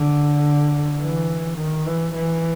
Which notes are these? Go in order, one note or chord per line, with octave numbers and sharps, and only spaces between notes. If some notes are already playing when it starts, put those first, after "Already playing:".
Already playing: D3
E3
D#3
E3
E3